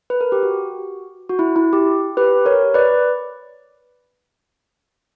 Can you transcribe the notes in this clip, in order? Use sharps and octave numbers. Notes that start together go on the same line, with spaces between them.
B4
A#4
G4
F#4
F#4
E4
E4
G4
G4 B4
A#4 C#5
B4 D5